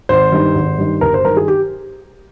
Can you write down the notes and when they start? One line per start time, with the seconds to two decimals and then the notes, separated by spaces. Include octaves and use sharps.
0.09 G#1 C5
0.32 G2 D#3
0.55 G#1
0.78 G2 D#3
1.01 G1 A#4
1.14 C5
1.25 G2 D#3 A#4
1.37 G#4
1.48 G4